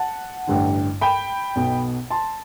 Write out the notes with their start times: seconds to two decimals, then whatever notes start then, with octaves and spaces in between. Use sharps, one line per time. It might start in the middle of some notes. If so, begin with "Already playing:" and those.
Already playing: F#5 A5
0.47 A1 G2 D3
1.01 G5 B5
1.56 B1 B2
2.10 A5 C6